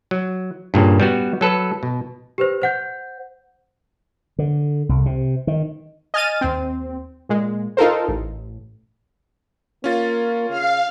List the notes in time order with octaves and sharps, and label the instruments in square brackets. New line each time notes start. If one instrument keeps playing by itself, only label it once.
[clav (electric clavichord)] F#3
G2 A#2 C#3
G3 B3 F#4
F#3 A4 B4
B2
[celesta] G4 B4 C5
C5 F#5 G6
[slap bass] D3
C2
C3
D#3
[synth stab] D#5 G#5 F6 A6 D#7
D#2 C4
A#2 G#3
D#4 F4 A4 A#4 C5
A1
[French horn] A#3 [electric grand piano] C#4 F4 A6
[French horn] C#3 [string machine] F5